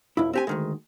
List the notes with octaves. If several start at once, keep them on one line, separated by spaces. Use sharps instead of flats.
B1 F2 E4
C4 G4 G#5
D2 D#3 G#3